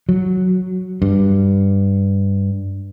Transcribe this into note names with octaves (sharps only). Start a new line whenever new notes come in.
F#3
G2